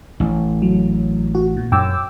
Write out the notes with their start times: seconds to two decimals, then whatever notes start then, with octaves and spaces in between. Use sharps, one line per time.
0.20 A1
0.62 F#3
1.35 F#4
1.57 A#2
1.72 F#2 G5 D6 E6